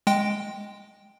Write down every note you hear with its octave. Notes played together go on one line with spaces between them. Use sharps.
G#3 G5